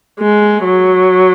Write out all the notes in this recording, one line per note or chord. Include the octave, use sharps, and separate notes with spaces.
G#3
F#3